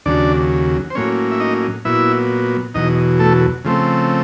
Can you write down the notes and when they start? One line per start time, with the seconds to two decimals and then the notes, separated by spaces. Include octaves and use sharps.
0.06 D#2 C#3 F#3 D4 D5
0.90 C5
0.95 A2 F#3 A#3 C#4 C#5
1.31 E5
1.40 D#4 D#5
1.85 A#2 F#3 B3 E4 E5
2.74 E2 B2 F#3 D#4 D#5
3.19 A3 A4
3.65 C#3 F3 A3 C4